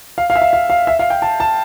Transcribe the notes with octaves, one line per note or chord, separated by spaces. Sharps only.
F5
F5
E5
F5
F5
F5
E5
F5
G5
A5
A5